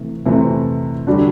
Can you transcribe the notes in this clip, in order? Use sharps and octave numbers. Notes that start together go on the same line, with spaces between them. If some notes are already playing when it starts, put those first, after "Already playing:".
Already playing: C3 E3 A3
C3 E3 A3 C4 E4
D3 G3 D4 F#4